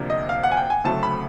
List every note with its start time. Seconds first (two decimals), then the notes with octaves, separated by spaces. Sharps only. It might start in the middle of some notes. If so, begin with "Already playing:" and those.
Already playing: D2 C3 F3 A#3 D4
0.10 D#5
0.29 F5
0.43 F#5
0.52 G#5
0.57 G5
0.70 G#5
0.84 D2 C#3 F#3 A3 C4 A5
1.03 B5